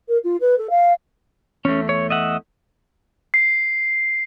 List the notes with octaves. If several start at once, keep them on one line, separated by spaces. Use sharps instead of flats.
A#4
F4
B4
A4
F5
E2 A3 C#4
C#5
D#5 E5 F#5
C7